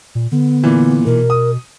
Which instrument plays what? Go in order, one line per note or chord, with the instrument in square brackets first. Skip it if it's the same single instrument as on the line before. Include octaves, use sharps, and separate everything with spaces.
[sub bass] A#2
[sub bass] D3 [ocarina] B3
[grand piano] A#2 E3
[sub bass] B2 [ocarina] A#4
[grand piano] D#6